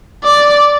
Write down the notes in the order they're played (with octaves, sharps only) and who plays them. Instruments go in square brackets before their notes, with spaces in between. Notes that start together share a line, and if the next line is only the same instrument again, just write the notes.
[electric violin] D5